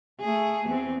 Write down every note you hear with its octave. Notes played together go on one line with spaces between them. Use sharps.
A3 G#4
E2 B3 C4